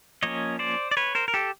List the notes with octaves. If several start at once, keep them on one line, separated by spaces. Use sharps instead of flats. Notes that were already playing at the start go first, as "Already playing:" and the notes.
F3 A#3 C#4 C#5 D#5
C5 D5
D5
B4 C#5
A#4 C5
A#4
G4 A4